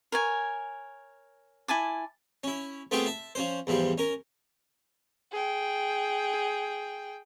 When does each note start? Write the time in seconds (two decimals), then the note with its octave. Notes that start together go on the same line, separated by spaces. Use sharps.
0.12 A#4 C#5 G#5
1.68 E4 G#5 A5 D6
2.44 C#4 E4
2.91 A3 B3 C4 F4 G4 G#4
3.06 E5 A5
3.35 F3 C#4 C5
3.67 E2 G#2 F3 G3
3.98 C#4 A#4
5.32 G#4 G5